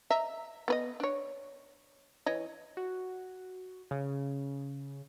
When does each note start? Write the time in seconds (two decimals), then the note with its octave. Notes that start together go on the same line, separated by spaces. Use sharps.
0.10 D#5 E5 A#5
0.68 B3 B4 D#5
1.00 D4 C#5
2.26 E3 C#5 D#5
2.77 F#4
3.91 C#3